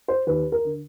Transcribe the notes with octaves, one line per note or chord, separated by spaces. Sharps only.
C5
D#2 B4
A#4
D3